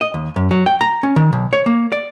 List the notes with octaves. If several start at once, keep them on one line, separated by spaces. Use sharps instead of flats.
D#5
D#2
F#2
F#3
G5
A#5
C#4
D#3
B1
C#5
A#3
D5